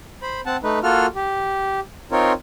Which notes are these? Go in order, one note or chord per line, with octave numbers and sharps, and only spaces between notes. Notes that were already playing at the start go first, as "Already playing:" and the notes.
C5 B5
C4 F#5 A5
A3 D#4 B4
A#3 F4 F#4 A4 F6
G4
C4 D#4 F4 A#4 C#5